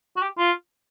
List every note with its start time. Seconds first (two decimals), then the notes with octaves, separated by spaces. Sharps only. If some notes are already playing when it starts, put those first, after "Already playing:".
0.16 F#4
0.22 G4
0.38 F4